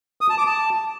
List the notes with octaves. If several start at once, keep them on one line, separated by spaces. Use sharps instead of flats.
D#6
A5
D6
A5